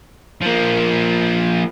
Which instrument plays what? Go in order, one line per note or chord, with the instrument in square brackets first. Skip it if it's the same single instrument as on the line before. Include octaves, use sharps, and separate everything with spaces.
[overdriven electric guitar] F3 A#3